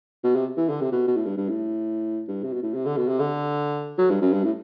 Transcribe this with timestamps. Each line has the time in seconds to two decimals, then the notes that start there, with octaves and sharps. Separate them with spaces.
0.24 B2
0.36 C3
0.58 E3
0.70 D3
0.81 C3
0.92 B2
1.08 B2
1.17 A2
1.26 G2
1.38 G2
1.50 A2
2.28 G2
2.43 C3
2.53 B2
2.63 A2
2.74 C3
2.86 D3
2.97 B2
3.09 C3
3.20 D3
3.98 F#3
4.11 G2
4.22 F#2
4.33 G2
4.44 A2